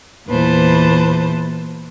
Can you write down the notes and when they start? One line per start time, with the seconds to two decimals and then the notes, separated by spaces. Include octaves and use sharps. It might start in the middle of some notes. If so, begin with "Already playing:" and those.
0.27 E2 A#2 E3 B4 C5 A5